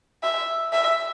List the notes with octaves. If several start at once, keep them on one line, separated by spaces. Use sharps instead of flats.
E5
E5